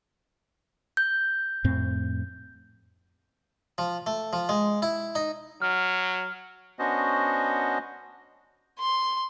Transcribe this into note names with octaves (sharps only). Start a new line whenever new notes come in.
G6
F2 A2 C4
F3
A3
F3
G#3
E4
D#4
F#3 F6
B3 C#4 D4 F#4 C5 D#5
C6